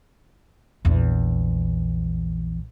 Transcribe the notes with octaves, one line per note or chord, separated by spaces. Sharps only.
A#1 E2